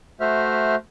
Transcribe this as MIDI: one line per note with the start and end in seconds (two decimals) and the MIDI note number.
0.21 0.75 57
0.21 0.75 66
0.21 0.75 72
0.21 0.75 76
0.21 0.75 89